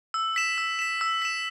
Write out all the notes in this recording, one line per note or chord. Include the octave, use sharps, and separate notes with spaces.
E6
B6 E7
E6
B6 E7
E6
B6 E7